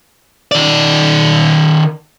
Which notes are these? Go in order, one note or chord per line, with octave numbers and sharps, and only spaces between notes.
D#3 D5